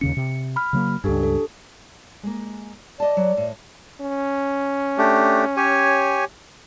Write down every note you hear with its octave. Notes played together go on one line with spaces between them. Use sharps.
D#2 C#3 C#4 C#7
C3
B5 F6
C#3 F#3 A#3
C#2 G2 D4 G4 A4
A4
G#3 A#3
D5 D#5 A5
F#3
A2
C#4
A3 D4 G4
G4 C#5 G#5